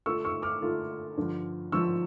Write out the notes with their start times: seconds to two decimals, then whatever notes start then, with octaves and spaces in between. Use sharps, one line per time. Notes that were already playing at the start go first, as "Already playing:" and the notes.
0.06 D3 A3 D4 F4 C#6 E6
0.25 C#6 E6
0.42 D6 F6
0.61 D3 A3 D4 F4
1.17 G2 D3 F3
1.72 G2 D3 F3 C#6 E6